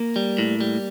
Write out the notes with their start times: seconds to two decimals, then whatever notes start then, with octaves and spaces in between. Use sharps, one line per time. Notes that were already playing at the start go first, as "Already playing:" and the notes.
Already playing: A#3
0.16 G3
0.38 A2
0.60 G3